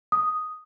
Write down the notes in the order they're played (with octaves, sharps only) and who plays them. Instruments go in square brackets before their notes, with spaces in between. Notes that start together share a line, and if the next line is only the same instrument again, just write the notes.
[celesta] D#6